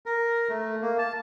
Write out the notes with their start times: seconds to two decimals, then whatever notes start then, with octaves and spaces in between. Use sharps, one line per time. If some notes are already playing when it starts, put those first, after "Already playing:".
0.06 A#4
0.49 A3
0.82 A#3
0.99 A5